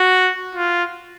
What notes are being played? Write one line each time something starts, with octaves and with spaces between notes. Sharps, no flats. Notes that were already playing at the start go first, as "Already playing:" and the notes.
Already playing: F#4
F4